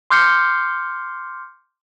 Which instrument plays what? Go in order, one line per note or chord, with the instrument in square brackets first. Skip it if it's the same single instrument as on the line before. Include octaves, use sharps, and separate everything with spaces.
[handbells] C6 D6 F6 G6 C7 C#7